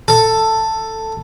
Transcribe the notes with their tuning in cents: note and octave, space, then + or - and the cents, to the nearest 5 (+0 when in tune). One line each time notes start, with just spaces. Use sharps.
A4 +10